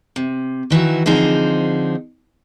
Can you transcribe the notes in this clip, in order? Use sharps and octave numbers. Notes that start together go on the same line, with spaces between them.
C3
D#3 E3 F#3 F#4
D3 F3 C4 D#4 G#4